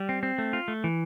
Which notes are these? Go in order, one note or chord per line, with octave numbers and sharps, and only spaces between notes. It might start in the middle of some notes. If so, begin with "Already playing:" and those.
Already playing: G3
C4
C4
A3
F4
A3
E3